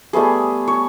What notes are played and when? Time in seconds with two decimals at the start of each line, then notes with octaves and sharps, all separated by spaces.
0.13 G3 A3 B3 G#4
0.67 C#5